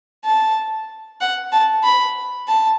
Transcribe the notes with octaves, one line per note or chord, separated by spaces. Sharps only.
A5
F#5
A5
B5
A5